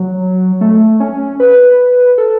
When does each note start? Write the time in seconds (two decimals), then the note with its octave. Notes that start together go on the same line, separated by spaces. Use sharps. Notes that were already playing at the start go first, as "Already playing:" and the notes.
Already playing: F#3
0.61 A3
1.00 C#4
1.40 B4
2.18 A4